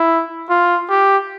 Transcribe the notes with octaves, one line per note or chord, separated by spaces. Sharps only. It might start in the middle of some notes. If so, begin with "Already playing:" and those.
Already playing: E4
F4
G4